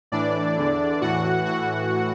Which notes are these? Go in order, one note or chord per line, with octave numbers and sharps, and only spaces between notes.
A2 E3 D4 D5
E2 D3
A2 E3 F#4 F#5
A2 E3 F#4 F#5